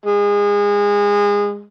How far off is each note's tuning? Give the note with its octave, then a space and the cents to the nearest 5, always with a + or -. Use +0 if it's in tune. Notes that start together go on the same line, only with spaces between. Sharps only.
G#3 -25